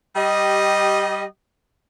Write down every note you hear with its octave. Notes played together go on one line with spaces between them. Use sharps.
G3 G4 D#5